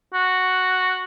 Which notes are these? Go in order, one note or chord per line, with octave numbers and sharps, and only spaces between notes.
F#4